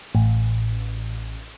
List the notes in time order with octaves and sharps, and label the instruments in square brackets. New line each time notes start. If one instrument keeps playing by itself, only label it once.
[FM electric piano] A1